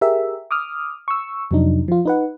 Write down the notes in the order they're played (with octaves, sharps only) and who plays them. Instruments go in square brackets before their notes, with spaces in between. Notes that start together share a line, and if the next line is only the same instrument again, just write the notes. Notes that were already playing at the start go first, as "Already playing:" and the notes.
[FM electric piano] G4 G#4 A#4 E5
D6 D#6 F6
C#6 E6
F2 C3 F#3 D4 D#4
F3 F4
D#4 B4 F#5